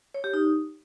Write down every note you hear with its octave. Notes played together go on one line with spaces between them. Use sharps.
C#5
G4
D#4